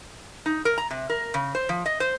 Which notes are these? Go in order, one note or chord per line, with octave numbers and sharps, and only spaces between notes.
D#4
A#4
A#5
C3
A#4
C#3
C5
F3
D#5
C5